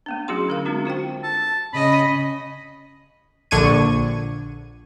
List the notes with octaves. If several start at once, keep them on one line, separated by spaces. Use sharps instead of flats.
A3 B3 D4
F#3 C#4 E4 F#4 G#4 C6
D3 A#4 F5
G#3 C4 D4 D#4 F#4
F4 F#4 C5 G5
A5
C#3 D#5 B5
A#1 D3 D4 C#6 G#6 D#7